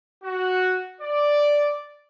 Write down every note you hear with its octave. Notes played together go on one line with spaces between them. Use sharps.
F#4
D5